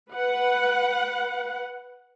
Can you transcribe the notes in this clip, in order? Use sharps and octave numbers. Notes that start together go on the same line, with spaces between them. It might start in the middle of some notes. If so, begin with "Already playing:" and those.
B4 F#5